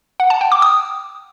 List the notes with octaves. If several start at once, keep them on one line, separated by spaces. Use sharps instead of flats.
F#5
A5
G5
D6
D#6